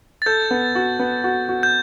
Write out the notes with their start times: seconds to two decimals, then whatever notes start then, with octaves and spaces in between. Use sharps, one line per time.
0.22 A6
0.26 A4 G6
0.51 B3
0.75 F#4
0.99 B3
1.24 F#4
1.49 F#4
1.63 G6